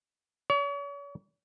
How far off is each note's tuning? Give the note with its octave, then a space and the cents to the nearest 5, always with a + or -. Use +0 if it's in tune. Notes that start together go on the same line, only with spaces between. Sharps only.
C#5 +40